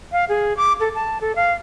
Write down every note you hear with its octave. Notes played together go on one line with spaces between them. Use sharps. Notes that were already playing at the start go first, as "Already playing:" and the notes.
F5
G#4
D6
A4
A5
A4
F5